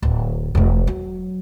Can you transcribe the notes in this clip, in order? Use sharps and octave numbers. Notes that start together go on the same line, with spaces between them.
D1
E1 A3
F#3